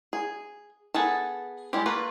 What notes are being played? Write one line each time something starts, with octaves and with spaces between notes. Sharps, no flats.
G#4
B3 G#4 A4 A5
G3 G#3 E4 G4
A3 A#3 F4 B4